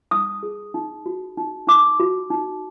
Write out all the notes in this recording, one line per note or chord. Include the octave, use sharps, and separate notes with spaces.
D#4 D#6
G#4
D#4
F#4
D#4
D#4 D6
F#4
D#4